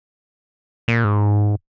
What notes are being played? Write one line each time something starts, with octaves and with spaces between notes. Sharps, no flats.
A#2
G#2